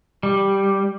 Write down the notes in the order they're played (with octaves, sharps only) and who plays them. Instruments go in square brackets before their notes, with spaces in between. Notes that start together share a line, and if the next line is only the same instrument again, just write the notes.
[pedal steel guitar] G3